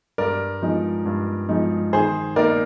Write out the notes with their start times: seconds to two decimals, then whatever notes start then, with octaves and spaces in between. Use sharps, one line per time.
0.18 G2 A#4 D5
0.62 F3 G#3 D#4
1.06 G2
1.49 F3 G#3 D#4
1.93 D#3 G#4 C5
2.36 A#3 D#4 A#4 D5